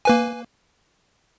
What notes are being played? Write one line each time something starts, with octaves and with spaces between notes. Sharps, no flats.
A#3 B4 G#5